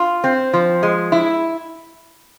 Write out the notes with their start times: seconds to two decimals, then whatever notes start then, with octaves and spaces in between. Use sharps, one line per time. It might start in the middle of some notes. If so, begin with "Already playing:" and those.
Already playing: F4
0.24 C4
0.53 F3
0.83 G#3
1.12 E4